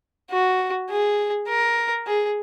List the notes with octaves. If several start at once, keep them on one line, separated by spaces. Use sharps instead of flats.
F#4
G#4
A#4
G#4